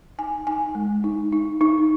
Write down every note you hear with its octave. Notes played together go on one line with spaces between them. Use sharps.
D#4 G#5
D#4 G#5
G#3
D#4
D#4
D#4